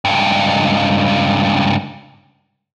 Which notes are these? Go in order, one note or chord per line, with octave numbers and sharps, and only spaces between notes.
C#2 G2